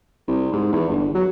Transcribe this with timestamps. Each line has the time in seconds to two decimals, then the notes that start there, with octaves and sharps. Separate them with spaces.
0.28 C2
0.53 G#2
0.73 E2
0.89 G1
1.15 F#3